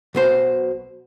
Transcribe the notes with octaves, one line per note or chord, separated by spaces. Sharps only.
B1 B2 C5